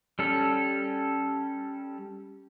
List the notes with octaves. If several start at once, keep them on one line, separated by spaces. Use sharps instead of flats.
G3 C#4 A4